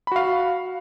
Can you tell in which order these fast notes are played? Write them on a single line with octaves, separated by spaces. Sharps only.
B5 F#4 F5